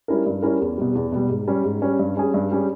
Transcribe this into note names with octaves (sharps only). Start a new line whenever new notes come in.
G3 C#4 E4 A#4
G2
G3 C#4 E4 A#4
E2
B2 G3
E2
B2 G3
G#2
G3 C#4
G#2
G3 C#4
G2
G3 C#4 G#4
G2
G3 C#4 G#4